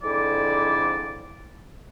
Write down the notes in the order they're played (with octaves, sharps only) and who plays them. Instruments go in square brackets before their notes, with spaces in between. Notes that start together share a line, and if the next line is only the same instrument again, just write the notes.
[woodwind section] F2 G#2 D3 E4 D5